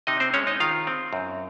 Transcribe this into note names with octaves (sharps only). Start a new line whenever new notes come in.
C3 D#4 D#5
C4 C5
G#3 C#4 C#5
D#4 D#5
D#3 F4 F5
C4
F#2